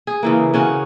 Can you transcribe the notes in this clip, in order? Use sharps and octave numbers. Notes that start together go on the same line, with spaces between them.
G#4
C#3 E3 A#3
C#3 C#4 F#4